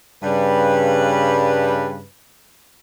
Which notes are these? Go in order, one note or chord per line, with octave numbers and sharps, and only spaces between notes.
G2 C#3 G3 B4